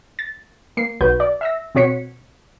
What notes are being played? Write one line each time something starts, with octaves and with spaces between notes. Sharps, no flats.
A6
A#3 C7
B1 F#4 B4 G6
D5
E5 E6 A#6
B2 C4 F#4 C#5 B6 C#7